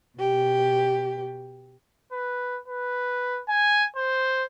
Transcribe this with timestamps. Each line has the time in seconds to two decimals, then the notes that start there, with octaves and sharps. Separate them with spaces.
0.18 B2 G4
2.12 B4
2.68 B4
3.49 G#5
3.96 C5